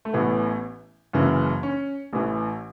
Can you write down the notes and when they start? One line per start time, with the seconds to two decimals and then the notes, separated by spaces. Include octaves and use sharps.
0.05 A3
0.13 A1 A2 E3 B3
1.13 F#1 F#2 C#3 E3
1.63 C#4
2.13 A1 A2 E3